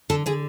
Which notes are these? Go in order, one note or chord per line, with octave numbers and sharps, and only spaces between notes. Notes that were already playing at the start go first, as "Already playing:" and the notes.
D3 A4
D3 G#4